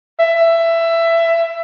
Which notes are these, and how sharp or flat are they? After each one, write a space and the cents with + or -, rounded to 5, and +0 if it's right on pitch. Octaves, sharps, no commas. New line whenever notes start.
E5 +15